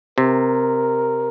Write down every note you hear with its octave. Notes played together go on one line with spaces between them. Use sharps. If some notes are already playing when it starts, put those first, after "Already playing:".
C3 A#4